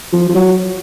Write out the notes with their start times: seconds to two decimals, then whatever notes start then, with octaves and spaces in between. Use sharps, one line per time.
0.12 F3
0.29 F3
0.35 F#3